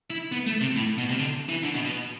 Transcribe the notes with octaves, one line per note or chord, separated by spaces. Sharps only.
E4
B3
A3
C3
A2
B2
C3
D3
E3
D3
B2
B2